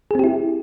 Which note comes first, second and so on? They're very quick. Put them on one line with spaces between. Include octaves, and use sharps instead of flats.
G#4 C4 G4 E4